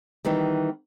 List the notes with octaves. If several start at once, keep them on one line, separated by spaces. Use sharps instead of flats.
D#3 E3 G3 B3 D#4